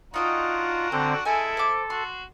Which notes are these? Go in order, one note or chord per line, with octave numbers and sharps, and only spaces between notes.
D4 D#4 F4 F#4 D#5 G5 A#5
D3 C4 A4
G#3 E4 A4 G#5
C5 D6
F#4 C6